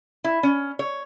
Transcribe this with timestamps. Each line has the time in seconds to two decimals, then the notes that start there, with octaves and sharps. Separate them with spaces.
0.24 E4
0.43 C#4
0.79 C#5